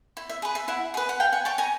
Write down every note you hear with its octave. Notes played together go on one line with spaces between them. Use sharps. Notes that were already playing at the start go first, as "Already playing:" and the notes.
E4
E5
G#4 B4
E5
E4 E5 F#5
G#4 B4
F#5
G#4 F5 G5
F#5 G#5
C#5 G5 A5
G#5 A#5